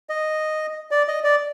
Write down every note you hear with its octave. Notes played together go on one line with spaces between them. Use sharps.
D#5
D5
D#5
D5